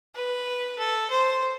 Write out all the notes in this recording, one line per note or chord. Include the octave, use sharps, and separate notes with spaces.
B4
A4
C5